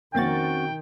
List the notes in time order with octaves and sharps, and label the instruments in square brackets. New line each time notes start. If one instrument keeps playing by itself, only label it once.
[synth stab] F2 A#3 A6 [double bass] D#3 [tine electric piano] C4 C#4 F#4 [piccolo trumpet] G5